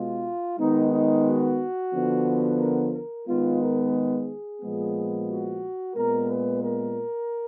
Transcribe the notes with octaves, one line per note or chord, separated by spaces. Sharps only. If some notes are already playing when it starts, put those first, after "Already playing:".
Already playing: B2 G#3 B3 F4
D#3 G#3 B3 D#4
D#4
F#4
D3 F3 B3
A#4
A#4
D#3 G#3 B3 F4
A#4
G#4
A#2 F3 G#3 B3
F#4
A#2 G#3 B3 A#4
B4
A#4